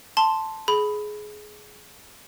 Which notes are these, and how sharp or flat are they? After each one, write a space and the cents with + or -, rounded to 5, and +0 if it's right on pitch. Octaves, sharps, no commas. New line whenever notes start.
A5 +0 C6 +0
G#4 +20 B5 +5